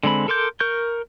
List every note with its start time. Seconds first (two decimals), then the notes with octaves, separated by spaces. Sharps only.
0.03 D3 G#3 C4 B5
0.28 A4 A#4 C6 D6 G6
0.60 A#4 C#6 G6